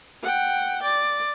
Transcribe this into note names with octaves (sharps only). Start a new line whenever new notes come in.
F#5 G5
D5